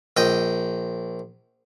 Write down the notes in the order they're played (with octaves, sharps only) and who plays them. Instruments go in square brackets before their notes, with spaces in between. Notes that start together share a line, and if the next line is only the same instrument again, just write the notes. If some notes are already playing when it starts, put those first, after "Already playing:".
[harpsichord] A#1 D#5 G5